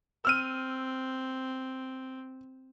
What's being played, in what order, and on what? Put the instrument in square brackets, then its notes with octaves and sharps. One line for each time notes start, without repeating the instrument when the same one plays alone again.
[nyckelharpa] C4 [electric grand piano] E6 F6 D#7